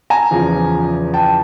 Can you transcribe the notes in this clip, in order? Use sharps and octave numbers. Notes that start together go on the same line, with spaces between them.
G#5 A#5
E2 C#3 F3
G5 A5